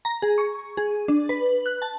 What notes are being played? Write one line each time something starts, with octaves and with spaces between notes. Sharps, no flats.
A#5
G#4
C#6
G#4
D4
B4
F#6
A5